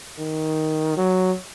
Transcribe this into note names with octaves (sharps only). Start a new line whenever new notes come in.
D#3
F#3